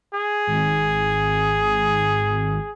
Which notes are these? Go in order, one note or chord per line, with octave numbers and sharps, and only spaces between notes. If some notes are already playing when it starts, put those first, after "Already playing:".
G#4
G#1